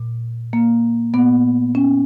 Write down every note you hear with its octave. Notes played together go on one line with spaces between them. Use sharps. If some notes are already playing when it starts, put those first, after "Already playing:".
Already playing: A#2
A#3
A#2 B3
C#4